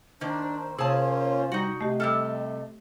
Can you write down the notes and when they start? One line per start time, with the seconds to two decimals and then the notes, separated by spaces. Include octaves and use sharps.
0.21 D#3 A#3 D4 C5
0.78 C3 A#3 C#4 F4 G#4 A5
1.52 G3 D#4 F#4
1.81 C3 A3 G4 D#5
2.00 G3 A3 A4 E6 F6